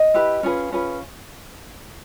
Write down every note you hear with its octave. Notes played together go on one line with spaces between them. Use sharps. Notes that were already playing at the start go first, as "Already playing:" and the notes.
Already playing: D#5
E4 G4 B4
C#4 F4 G#4 B4
C#4 F4 G#4 B4